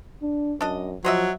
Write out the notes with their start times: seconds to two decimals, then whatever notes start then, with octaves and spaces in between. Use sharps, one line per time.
0.22 D4
0.61 F#2 D4 D#5
1.04 F3 F#3 C5 D#5 E5